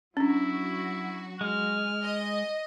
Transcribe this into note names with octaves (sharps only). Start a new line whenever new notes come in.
F#3 C#4 D4 E4 F#4
G#3 F6
D#5